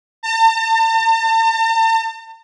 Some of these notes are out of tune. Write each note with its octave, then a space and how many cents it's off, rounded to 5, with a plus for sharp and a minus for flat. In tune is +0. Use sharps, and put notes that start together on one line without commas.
A5 +45